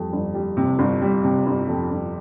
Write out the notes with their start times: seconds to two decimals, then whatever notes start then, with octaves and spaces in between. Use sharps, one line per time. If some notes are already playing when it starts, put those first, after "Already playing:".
Already playing: F2 G3
0.12 G1
0.34 G3
0.57 C3
0.79 G1
1.02 G3
1.24 C3
1.46 G1
1.68 F2
1.91 G1